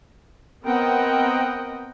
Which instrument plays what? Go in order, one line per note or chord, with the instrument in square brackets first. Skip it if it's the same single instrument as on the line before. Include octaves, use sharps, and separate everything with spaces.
[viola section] B3 C4 A#4 D#5 F#5 G5